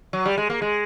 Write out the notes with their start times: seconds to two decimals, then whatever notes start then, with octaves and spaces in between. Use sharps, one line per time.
0.13 F#3
0.25 G3
0.37 G#3
0.50 A#3
0.62 G#3